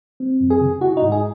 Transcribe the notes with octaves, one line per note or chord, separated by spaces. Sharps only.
C4
F#2
G#4
C#3
E4 F#4
D#4
G#2
G#4